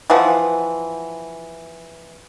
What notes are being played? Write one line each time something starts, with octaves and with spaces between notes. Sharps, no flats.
E3 F3 F#5